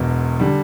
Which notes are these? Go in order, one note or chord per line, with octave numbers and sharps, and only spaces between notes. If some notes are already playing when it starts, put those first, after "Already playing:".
Already playing: E1 E2 B2
D3 G3